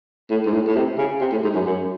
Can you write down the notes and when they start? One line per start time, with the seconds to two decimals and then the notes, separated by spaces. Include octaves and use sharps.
0.30 A2
0.46 G#2
0.53 A2
0.67 A2
0.76 C3
0.98 C#3
1.21 C3
1.32 A2
1.44 G#2
1.55 F#2
1.66 F#2